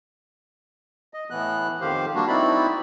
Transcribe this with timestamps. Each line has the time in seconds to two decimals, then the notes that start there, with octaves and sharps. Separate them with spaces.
1.14 D#5
1.30 A2 E3 B3 F#6
1.81 F2 D#3 G4 C5 F5
2.15 G3 A#3 D4 F#4
2.28 C4 D#4 E4 F#4 D5 B5